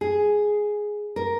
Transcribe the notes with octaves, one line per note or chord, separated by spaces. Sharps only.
G#4
A#4